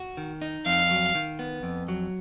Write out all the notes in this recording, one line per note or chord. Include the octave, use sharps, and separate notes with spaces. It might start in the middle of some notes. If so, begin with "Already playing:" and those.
Already playing: F#4
D#3
D#4
F2 F5
F#3
D#3
B3
F2
F#3